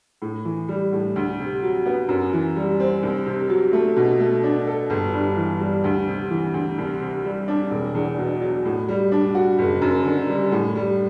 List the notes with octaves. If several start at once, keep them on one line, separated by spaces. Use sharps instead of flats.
A2
E3
G3
A2
D2
C3
F#3
B3
F#2
E3
G3
C4
C2
C3
F#3
A3
B2
A3
D4
A4
G1
G2
E3
G3
D2
C3
E3
D2
C2
C3
G3
D4
E1
E2
B2
F#3
A2
G3
D4
F#4
F#1
F#2
D3
G3
A2
G3